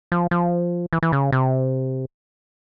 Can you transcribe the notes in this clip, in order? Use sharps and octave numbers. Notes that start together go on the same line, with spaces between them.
F3
F3
E3
E3
C#3
C3